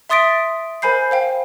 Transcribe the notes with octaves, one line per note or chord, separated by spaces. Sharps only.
E5 C6 D#6 A6 B6 D7
A#4 C5 G#5 B5 G6 C7
C5 F5 G5